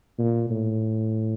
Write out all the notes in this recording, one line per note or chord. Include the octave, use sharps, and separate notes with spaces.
A#2
A2